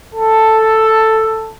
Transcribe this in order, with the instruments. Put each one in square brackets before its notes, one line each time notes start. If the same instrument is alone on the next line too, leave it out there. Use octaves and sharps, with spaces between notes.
[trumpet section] A4